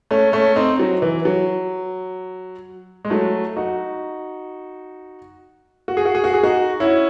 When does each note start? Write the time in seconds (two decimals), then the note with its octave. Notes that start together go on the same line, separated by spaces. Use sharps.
0.11 A3 C#4
0.33 A3 C#4
0.56 C4 D#4
0.79 F#3
1.02 E3
1.25 F#3
3.05 G#3
3.10 F#3 A3
3.57 D#4 F#4
5.88 F#4
5.97 G#4
6.05 F#4
6.15 G#4
6.24 F#4
6.34 G#4
6.43 D#4 F#4
6.80 C#4 E4